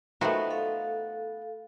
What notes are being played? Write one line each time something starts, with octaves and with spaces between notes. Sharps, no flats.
D#3 F3 A3 B3 F#4
A4 F5